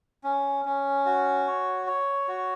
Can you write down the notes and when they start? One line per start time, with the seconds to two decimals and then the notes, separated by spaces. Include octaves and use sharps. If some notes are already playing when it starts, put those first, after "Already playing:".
0.24 C#4
0.65 C#4
1.06 F#4
1.47 C#5
1.87 C#5
2.28 F#4